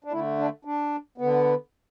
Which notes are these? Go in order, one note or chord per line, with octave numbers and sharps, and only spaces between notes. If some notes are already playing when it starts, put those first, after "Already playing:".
D4
D3 A3 E4
D4
D4
D3 B3